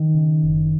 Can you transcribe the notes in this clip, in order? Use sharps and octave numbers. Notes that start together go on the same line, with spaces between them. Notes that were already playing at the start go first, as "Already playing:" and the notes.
Already playing: D#3
C#3
F#1